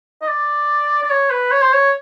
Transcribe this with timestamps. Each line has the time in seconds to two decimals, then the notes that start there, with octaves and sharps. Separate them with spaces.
0.21 D#5
0.28 D5
1.03 D5
1.10 C#5
1.30 B4
1.51 C#5
1.62 C5
1.73 C#5